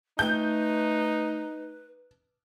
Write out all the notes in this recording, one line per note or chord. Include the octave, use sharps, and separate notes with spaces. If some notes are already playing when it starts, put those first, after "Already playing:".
A3 D#4 B4 G6